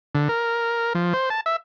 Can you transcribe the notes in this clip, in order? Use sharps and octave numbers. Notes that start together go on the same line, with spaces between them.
D3
A#4
F3
C5
A5
E5